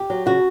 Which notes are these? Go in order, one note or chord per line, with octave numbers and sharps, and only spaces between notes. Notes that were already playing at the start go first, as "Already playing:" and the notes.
Already playing: G4
F#3
C#3 F#4